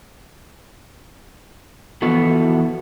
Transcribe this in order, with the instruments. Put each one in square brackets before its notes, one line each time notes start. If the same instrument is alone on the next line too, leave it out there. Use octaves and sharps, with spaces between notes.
[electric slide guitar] E3 F3 B3 E4 F#4 A4